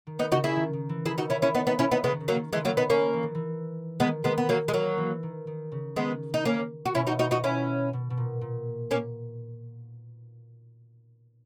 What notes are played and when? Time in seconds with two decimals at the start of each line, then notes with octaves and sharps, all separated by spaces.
0.07 D#3
0.19 B3 D#4
0.32 C#3 D#4 F#4
0.44 E4 G#4
0.56 D#3
0.73 D#3
0.89 E3
1.06 D#3 E4 G#4
1.18 D#4 F#4
1.30 C#4 E4
1.42 C#4 E4
1.55 B3 D#4
1.67 B3 D#4
1.79 C#4 E4
1.91 B3 D#4
2.04 C#3 G#3 B3
2.13 D#3
2.20 C#3
2.28 F#3 A#3
2.36 D#3
2.52 D#3 E3 G#3
2.65 F#3 A#3
2.77 B3 D#4
2.90 A#3 C#4
3.13 E3
3.23 D#3
3.35 E3
4.00 D#3 G#3 B3
4.24 D#3 G#3 B3
4.38 B3
4.49 F#3 A#3
4.68 G#3
4.74 F#3 A#3
4.98 E3
5.23 D#3
5.47 D#3
5.72 C#3
5.96 D#3 G#3 B3
6.34 D#4
6.45 A#3 C#4
6.86 F#4
6.95 B2 C#4 E4
7.07 D#4 F#4
7.19 D#4 F#4
7.31 D#4 F#4
7.44 C#4 E4
7.93 B2
8.10 B2
8.17 A#2
8.41 A#2
8.91 A#3 C#4